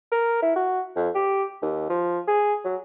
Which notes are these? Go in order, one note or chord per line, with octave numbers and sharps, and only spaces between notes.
A#4
E4
F#4
F2
G4
D#2
F3
G#4
F#3